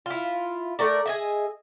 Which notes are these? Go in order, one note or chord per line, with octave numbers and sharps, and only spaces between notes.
E4 F4
A3 A#4 D5
G#4 D#5 E5